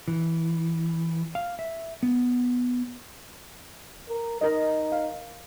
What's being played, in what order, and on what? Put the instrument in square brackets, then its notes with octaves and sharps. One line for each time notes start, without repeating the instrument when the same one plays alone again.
[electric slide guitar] E3
F5
E5
B3
[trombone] A#4
[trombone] D#4 [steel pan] A#4 D#5
[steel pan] F5